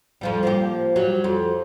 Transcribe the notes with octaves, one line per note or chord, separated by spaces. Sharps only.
F2 F3 G3
F3 A#3 G4
F#3 G3
F2